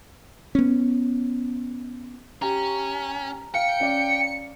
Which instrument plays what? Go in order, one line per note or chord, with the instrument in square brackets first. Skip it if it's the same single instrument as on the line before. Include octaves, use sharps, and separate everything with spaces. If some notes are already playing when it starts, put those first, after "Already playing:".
[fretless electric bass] B3 C#4
[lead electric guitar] C#4 [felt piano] G4 [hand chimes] A#5
[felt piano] F5 [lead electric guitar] G5 [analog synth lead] C#7
[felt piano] C#4 D5 F5